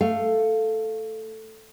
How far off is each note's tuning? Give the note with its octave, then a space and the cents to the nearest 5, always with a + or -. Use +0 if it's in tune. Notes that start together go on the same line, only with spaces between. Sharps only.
A3 +0 F5 -10